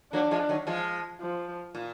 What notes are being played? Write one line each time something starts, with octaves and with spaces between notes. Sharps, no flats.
F#3 A#3 D4
F3 G#3
D#3 F#3
F3 G#3
F3
A#2